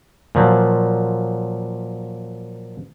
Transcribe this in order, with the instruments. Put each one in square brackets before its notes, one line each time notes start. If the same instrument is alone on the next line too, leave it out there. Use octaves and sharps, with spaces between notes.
[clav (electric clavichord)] A#2 F3 F#3